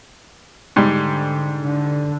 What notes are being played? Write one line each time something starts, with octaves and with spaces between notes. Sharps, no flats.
G#2 D3 G3
D3